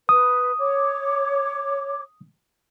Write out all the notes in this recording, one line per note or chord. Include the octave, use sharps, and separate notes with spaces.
B4 D#6
C#5 D6